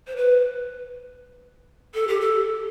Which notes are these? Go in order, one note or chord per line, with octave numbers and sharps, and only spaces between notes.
C5
B4
A4
G4
A4